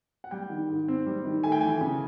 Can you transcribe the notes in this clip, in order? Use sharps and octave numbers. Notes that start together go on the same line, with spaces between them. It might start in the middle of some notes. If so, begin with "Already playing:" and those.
F#5
G3 G5
D#3
G#2
C4
G3
D#3
A3 G#5
G5
E3 G#5
C#3